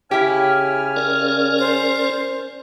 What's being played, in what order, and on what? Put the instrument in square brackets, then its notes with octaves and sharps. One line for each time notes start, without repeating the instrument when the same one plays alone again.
[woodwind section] C#3 G#5 F6 [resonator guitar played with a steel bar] E4 G4
[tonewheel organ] C#4 A#4 D5
[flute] C5